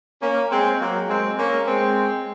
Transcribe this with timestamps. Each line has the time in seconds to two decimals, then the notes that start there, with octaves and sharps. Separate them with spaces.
0.20 A#3 C#4
0.49 G#3 C4
0.79 F#3 A#3
1.08 G#3 C4
1.37 A#3 C#4
1.66 G#3 C4